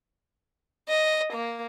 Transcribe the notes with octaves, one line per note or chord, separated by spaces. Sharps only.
D#5
A#3